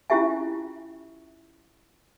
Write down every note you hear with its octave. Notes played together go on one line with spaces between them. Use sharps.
C#4 E4 F4 G4 E5 G#5